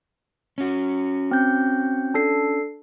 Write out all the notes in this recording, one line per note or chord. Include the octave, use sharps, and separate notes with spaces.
C#4 F#4
C4 G6
D4 A4 C7